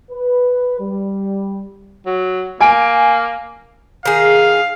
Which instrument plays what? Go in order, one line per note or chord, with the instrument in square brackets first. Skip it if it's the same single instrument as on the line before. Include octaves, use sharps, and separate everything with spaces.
[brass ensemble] B4
G3
[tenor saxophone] F#3
[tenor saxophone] A#3 [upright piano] G#5 D7
[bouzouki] D#3 G#4 [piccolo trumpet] F5